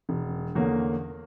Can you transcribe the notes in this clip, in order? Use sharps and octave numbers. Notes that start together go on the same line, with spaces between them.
E1
E2 D3 A#3 C#4